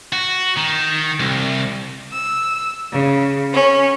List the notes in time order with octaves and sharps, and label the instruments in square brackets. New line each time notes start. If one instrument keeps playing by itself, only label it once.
[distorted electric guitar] F#4
D#3
C2
[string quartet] E6
C#3
C#4